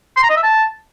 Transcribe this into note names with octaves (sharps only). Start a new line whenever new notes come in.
C6
A#5
D#5
E5
A5